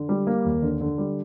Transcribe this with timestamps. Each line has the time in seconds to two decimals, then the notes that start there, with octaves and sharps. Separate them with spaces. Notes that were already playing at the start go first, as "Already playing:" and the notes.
Already playing: D3
0.09 G3
0.27 A#3
0.45 D#2
0.62 D3
0.81 D3
0.98 G3